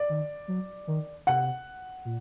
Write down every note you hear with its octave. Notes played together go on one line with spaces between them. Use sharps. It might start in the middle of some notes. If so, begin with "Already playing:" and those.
Already playing: D5
D#3
F#3
D#3
C3 F#5
A#2